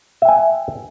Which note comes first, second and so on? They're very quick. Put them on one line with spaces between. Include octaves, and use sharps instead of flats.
E5 G5 G#5